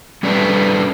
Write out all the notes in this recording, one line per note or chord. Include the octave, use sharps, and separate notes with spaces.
G3 C#4 D4 A4 B4 E5